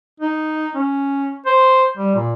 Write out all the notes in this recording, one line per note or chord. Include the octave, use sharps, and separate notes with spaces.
D#4
C#4
C5
G3
A#2